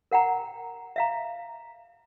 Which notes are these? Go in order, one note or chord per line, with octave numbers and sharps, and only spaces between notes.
A#4 F#5 G5 A#5
E5 F5 A#5